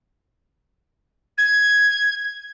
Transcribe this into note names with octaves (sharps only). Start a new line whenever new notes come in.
G#6